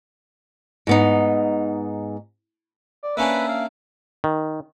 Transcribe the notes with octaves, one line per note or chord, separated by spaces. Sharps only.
G#2 B3 D#4
D5
A#3 C#4 D4 B4 E5
F5
D#3